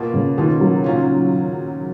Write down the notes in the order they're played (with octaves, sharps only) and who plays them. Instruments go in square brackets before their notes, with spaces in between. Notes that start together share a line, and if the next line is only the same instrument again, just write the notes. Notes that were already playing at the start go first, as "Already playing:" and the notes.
Already playing: [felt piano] B2 A#3 F4
[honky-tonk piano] C#3
[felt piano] B2 A#3 F4 [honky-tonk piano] D#3
[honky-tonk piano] F#3
[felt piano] A#2 F#3 C#4 F4